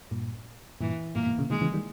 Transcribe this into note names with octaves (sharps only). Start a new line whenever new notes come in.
G2 A#2
G2 A#2 E3
G2 A#2 A#3
G#2 B2
A#2 C#3
B2 D#3 G#3
C#3 E3
D#3 G3